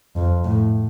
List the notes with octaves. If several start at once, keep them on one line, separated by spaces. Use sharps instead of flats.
F2
A2